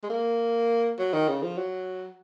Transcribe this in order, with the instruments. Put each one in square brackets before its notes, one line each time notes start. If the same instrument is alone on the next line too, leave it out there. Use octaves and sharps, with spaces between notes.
[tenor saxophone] G#3
A#3
F#3
D#3
C#3
F3
F#3